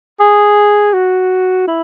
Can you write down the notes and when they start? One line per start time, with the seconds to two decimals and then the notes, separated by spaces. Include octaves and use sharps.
0.20 G#4
0.94 F#4
1.67 E4